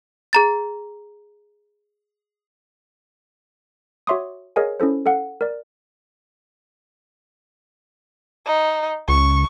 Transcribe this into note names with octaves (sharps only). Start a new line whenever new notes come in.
G#4 A#5 A6
F#4 C#5 E5 C6 D6 D#6
G#4 A#4 C#5 D#5 F5 G#5
C#4 E4 A4 C5
A4 F5 F#5
A#4 D5
D#4
C#2 C#6